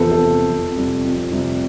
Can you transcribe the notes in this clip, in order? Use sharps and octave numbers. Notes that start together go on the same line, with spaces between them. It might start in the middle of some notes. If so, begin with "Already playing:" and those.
Already playing: E2 C3 F3 A4 B4 C5
A4
C3 F3
F2
C3 G3
F2
C3 G3